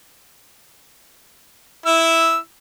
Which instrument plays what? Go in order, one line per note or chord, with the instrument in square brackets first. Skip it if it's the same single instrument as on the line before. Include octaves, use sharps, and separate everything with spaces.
[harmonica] E4 E6